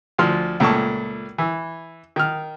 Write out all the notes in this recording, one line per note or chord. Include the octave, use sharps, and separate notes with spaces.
D2 F3 C6 F6
C#2 A#2 A3 A5 C#6
E3
D#3 F6